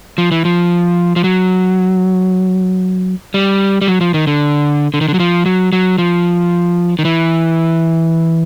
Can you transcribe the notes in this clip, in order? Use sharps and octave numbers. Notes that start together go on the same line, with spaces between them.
F3
E3
F3
F3
F#3
G3
G3
F#3
F3
D#3
D3
D3
D#3
D3
F#3
F3
F#3
F#3
F3
D#3
E3